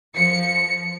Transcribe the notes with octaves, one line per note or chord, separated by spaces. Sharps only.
F3 C#7